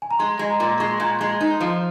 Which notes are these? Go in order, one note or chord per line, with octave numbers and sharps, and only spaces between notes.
G#5
A#5
G#3 C6
G#3
A#5
A#2
G#3 C#6
C6
A#2 A#5
G#3 C6
D#4
F3